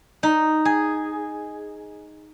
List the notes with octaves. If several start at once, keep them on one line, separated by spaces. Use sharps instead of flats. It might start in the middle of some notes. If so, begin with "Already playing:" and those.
D#4
G#4